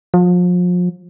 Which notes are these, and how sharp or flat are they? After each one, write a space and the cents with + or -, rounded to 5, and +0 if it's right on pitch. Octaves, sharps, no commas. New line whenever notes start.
F3 +35